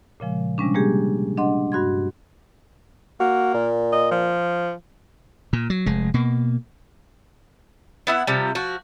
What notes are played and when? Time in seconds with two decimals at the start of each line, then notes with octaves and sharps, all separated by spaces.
0.20 A#2 C#3 F3 G#3
0.58 C3 G3 G#3 C#4 D4
0.74 G3 G#3 A#3 G4 G#4
1.37 D4 D#5 F#5 C6
1.72 G2 F#4 C6 G#6
3.20 A#3 F#4
3.54 A#2
3.92 D#5
4.11 F3
5.53 A#2
5.70 F#3
5.86 F1 G#3
6.14 B2 A#3
8.07 B3 E4 F#5
8.27 C3 F3 G3
8.55 F3 F#4